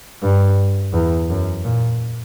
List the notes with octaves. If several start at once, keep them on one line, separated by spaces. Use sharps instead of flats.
G2
E2
F#2
A#2